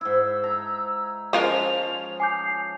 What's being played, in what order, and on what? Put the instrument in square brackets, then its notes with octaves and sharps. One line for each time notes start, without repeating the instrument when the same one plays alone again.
[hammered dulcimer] G#2 E4 [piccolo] E6
[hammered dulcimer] A#5
[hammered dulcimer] F3 C#4 [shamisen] G#3 F4 A#4 [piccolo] F7
[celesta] G#5 D6 G6 [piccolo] C7